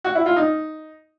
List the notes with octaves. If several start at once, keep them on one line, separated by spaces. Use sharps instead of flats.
F#4
E4
F4
D#4